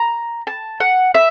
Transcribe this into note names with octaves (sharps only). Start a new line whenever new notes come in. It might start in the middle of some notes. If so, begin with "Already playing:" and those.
Already playing: A#5
A5
F#5
E5